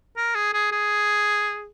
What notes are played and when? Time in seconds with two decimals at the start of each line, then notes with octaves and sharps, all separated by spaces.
0.17 A#4
0.35 G#4
0.54 G#4
0.72 G#4